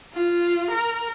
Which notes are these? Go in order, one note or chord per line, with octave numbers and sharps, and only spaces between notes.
F4
A#4